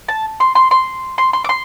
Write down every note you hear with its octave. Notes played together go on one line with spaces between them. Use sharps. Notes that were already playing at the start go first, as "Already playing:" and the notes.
A5
C6
C6
C6
C6
C6
D6
C6